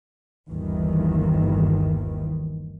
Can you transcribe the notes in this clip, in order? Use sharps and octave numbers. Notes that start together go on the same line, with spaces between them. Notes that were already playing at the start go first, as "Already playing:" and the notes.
G1 D#2 D#3 E3